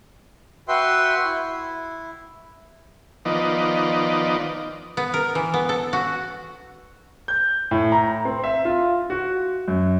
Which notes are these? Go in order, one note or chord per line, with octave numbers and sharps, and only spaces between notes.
F#4 B4 E5 G5 C6
E4
D#3 F3 B3 D#4 D5
B3
A#4
E3
B3
A4
F#4
G6
A2
A#5
C4
E5
F4
F#4
F#2